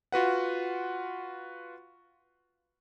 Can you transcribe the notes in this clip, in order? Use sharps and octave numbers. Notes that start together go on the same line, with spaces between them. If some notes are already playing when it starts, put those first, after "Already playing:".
F4 F#4 B4 F#5